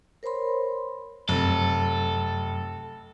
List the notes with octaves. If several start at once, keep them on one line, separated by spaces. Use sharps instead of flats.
A#4 C5 C#5 B5 C6
F1 F#2 A4